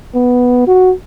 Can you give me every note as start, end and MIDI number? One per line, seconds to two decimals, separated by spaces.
0.15 0.63 59
0.67 0.93 66